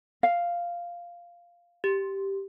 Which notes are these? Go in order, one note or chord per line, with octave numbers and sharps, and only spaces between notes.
F5
G4